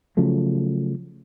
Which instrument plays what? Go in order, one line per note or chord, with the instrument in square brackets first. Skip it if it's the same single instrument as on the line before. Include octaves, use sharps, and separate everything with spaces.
[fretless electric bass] C#3 F3 F#3 A3